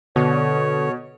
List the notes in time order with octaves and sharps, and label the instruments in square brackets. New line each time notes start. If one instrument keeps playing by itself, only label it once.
[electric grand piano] B2 [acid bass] D3 [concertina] C#5